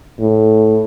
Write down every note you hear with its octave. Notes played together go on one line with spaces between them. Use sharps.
A2